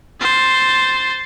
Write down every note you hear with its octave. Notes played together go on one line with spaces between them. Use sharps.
C5 A6